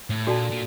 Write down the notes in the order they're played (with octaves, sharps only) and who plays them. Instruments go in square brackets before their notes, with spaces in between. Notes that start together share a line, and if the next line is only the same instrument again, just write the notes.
[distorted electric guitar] A2
[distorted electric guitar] A#2 [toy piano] D4 F#4 A4 D5 A5
[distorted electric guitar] A#2